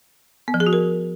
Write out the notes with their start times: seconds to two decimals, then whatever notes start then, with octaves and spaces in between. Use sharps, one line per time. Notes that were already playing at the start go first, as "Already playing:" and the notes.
0.48 B3
0.54 F3
0.60 G#4
0.66 F#4
0.73 A#4